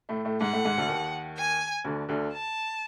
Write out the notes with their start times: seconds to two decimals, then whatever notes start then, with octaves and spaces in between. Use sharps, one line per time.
0.09 A2 A3
0.25 A2 A3
0.41 G#2 G#3 F#5
0.53 A2 A3
0.65 G#2 G#3
0.77 D2 D3
0.89 D#2 D#3
1.38 G#5
1.85 D2 D3
2.09 D2 D3
2.33 A5